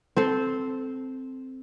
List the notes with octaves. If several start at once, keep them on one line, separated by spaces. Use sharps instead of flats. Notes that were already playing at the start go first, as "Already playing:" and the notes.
C4 A4 C5